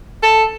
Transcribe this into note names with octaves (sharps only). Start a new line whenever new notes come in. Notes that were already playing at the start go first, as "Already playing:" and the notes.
A4